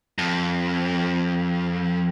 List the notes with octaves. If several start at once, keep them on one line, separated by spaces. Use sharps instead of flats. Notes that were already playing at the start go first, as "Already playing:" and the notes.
F2